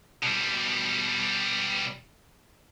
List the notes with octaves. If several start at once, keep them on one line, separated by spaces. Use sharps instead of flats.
B2 G3